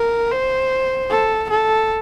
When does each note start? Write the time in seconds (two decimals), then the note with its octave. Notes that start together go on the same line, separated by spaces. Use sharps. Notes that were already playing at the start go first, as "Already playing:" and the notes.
Already playing: A#4
0.32 C5
1.10 A4
1.50 A4